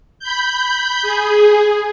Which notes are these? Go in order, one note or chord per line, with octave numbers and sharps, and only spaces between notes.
B5 G6
G#4